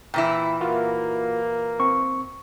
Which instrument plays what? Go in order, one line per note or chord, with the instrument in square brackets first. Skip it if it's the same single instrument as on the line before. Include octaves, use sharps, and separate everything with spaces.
[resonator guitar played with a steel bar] A#2 E3 E4 [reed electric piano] G5
[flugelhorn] A#3 [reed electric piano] F4 F#4
[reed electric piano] C4 [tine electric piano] C#6